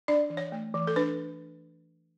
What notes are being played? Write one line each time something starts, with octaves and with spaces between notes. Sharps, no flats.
D4 D5
E3
C#5
A3
E3
A4
D4 B4